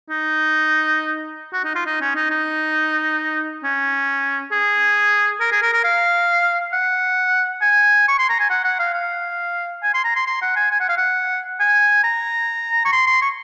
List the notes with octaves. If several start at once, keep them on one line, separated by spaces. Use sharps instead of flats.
D#4
F#4
D#4
F4
D#4
C#4
D#4
D#4
C#4
G#4
A#4
G#4
A#4
A#4
F5
F#5
G#5
C#6
C6
A#5
G#5
F#5
F#5
F5
F5
G#5
C6
A#5
C6
C6
F#5
G#5
G#5
F#5
F5
F#5
G#5
A#5
C#6
C6
C6
C#6